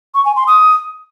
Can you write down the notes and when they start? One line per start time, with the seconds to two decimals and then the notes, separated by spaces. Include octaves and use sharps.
0.14 C#6
0.25 G#5
0.36 C6
0.47 D#6